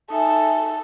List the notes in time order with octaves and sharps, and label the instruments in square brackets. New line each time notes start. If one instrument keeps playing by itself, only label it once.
[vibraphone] D#4 E5 G#5 [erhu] A4